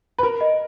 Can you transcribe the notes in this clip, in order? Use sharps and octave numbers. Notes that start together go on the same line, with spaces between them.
B4
A#4 B5
D#5